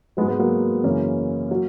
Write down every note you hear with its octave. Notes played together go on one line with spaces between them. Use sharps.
G#2 F#3 G#3 B3
G#3 B3
F#3 A#3
F#2 C#3 E3 A#3 C#4
F#3